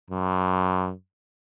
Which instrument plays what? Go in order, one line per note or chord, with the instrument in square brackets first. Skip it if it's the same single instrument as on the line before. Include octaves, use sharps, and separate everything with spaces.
[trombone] F#2